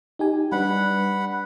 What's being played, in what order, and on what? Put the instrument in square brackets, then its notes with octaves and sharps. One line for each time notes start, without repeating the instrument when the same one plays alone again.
[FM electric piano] D#4 G4 G#5
[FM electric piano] G3 D4 B4 [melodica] F#5 B5